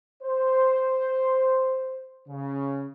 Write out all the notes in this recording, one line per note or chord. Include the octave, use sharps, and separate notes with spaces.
C5
C#3